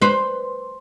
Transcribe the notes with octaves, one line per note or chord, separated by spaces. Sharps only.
B4 C5